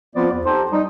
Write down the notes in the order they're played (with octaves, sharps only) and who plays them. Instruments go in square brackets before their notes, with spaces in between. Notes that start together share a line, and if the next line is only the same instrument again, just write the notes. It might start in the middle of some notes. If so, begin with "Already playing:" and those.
[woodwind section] F3 B3 C4 F4 C5 D5
E2
D#4 G4 A4 C5
G3 D#4